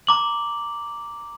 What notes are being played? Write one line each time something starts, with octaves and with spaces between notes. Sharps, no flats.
A#5 D6 F#7